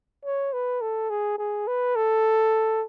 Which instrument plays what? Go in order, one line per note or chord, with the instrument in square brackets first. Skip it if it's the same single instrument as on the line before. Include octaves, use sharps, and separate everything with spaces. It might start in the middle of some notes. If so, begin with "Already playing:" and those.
[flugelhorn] C#5
B4
A4
G#4
G#4
B4
A4